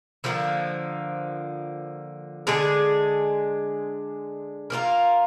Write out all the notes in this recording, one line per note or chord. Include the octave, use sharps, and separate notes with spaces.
D3 F3 A#3
D3 G#3 D4 G#4
A#3 D4 F4 A#4